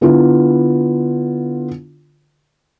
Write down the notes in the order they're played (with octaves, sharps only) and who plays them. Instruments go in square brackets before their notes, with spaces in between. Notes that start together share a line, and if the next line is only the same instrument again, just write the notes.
[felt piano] D3 B3 E4 F4